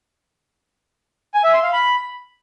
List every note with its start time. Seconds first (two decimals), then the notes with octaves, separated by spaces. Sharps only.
1.34 G#5
1.44 E5
1.53 C6
1.63 F5
1.73 B5